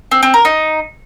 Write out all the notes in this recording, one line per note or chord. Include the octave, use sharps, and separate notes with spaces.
C4
C4
A#4
D#4